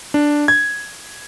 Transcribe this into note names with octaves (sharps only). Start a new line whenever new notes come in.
D4
G#6